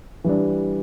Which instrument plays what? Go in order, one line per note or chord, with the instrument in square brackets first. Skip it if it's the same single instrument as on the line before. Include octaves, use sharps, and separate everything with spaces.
[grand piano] E3 G3 D4